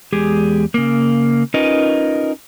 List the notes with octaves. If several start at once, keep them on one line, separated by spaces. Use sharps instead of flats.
E2 G#3 G4 G#4
C#3 A#3
C#4 D#4 F4 A#4 B4 D#5